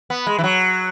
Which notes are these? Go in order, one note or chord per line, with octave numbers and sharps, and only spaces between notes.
B3
G#3
E3
F#3